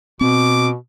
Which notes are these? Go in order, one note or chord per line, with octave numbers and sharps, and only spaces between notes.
B2 C4 D6